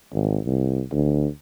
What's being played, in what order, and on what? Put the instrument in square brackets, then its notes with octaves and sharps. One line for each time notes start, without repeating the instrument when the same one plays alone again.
[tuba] G#1
C2
D2